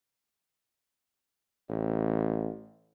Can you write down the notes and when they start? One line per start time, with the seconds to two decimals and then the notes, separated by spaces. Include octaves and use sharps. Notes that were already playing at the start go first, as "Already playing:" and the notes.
1.69 A1